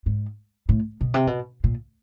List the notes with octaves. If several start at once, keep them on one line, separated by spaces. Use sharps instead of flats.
G#2
A2
B2
C3
B2
A#2